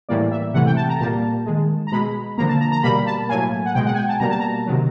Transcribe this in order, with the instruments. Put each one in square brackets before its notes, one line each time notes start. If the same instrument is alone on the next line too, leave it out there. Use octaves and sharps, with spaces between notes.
[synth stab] A2 E3 G3 A#3 D5
E5
C3 E3 A3 F#5
G5
A5
A#5
A#2 G3 A#3 A5
D#3 G#3
A#5
B2 G#3 B5
D3 F3 A#3 A#5
A5
A#5
A#5
B2 G3 A#3 B5
A5
A2 F#3 A#3 G#5
F#5
B2 G#3 G5
F#5
G#5
G5
A5
B2 G3 A#3 A#5
A5
A#5
C3 D#3 F#3